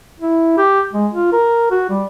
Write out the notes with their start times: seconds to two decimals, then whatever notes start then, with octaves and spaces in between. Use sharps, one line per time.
0.20 E4
0.58 G4
0.93 G#3
1.14 F4
1.33 A#4
1.71 F#4
1.90 G3